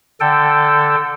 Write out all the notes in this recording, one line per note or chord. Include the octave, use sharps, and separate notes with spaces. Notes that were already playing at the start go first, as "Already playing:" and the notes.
D3 A4 G5